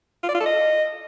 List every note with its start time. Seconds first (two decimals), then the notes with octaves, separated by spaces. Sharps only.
0.23 F4
0.29 D5
0.35 F4
0.40 A4
0.46 D#5